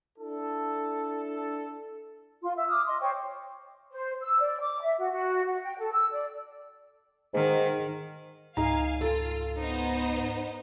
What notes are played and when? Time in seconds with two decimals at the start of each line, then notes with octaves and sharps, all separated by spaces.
0.18 D4 E4 A4
2.43 F4 C6
2.56 E5 E6
2.69 D6 D#6 F6
2.87 D#5 C6
3.01 C5 C#5 G5 C#6
3.91 C5
4.21 E6
4.40 D5
4.60 D6
4.81 E5
4.99 F#4
5.12 F#4
5.46 F#4
5.64 G5
5.79 A4
5.92 E6
6.11 D5
7.34 G#2 D#3
8.57 C#2 G#2 D#4 F5 G#5 A#5
9.01 F4 A4
9.58 B3 D#4 C5